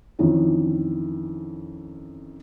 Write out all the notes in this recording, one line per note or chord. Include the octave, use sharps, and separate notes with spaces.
F2 D#3 E3 C#4